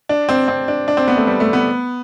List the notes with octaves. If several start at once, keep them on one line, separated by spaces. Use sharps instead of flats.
D4
C4
C4
D4
D4
C4
B3
A3
G3
A3
B3